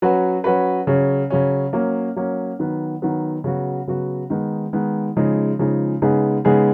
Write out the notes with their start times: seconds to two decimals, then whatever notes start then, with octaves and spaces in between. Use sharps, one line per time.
0.02 F#3 C#4 F#4 B4
0.44 F#3 C#4 F#4 B4
0.87 C#3 F#3 C#4
1.30 C#3 F#3 C#4
1.73 F#3 A#3 C#4
2.16 F#3 A#3 C#4
2.59 D#3 F#3 B3
3.02 D#3 F#3 B3
3.44 C#3 F#3 B3 F#4
3.87 C#3 F#3 B3 F#4
4.30 D#3 G#3 B3 D#4
4.73 D#3 G#3 B3 D#4
5.17 C#3 F3 G#3 D#4
5.59 C#3 F3 G#3 D#4
6.02 C#3 G#3 B3 D#4 G#4
6.45 C#3 G#3 B3 D#4 G#4